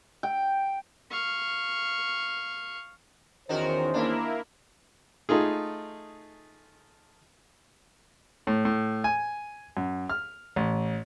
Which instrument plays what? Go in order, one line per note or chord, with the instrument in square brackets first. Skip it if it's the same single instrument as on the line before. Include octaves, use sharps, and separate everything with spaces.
[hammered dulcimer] G5
[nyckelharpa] F5 C#6
[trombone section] E2 C#4 C5 [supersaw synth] D#3 [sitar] D#4 F#4 A#4
[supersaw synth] A#3 E4 A#4 [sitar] D4
[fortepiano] A3 D#4 F4 G#4
A2
A2
G#5
F#2
F6
A1